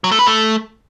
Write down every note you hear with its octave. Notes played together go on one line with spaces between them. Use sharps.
F#3
A3
B4
A3